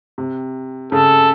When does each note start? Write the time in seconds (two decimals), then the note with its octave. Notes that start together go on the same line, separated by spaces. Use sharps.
0.18 C3
0.92 C#3 A4